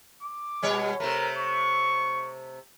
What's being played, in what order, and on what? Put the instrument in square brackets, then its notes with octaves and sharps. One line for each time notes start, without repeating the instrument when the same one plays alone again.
[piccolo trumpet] D6
[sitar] B2 G3 C#5
[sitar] C3 A3 [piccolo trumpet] A#4
[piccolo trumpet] C#6